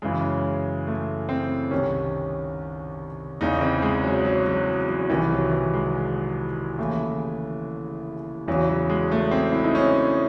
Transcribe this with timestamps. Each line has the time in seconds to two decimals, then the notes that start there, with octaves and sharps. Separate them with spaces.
0.02 F#2 C#3 E3 G#3
0.87 A3
1.29 C4
1.71 C2 C3 D#3 C#4
3.41 E2 C#3 E3 D#4
3.61 C4
3.82 G#3
4.04 F#3
4.25 F#3
4.46 F#3
4.89 F#3
5.10 C2 C3 D#3 E3
5.30 F#3
5.52 E3
5.73 G#3
6.79 D#2 C#3 E3 A3
8.48 E2 C#3 E3 F#3
8.69 F#3
8.90 G#3
9.11 A3
9.31 C4
9.52 E4
9.64 D#4
9.75 C#4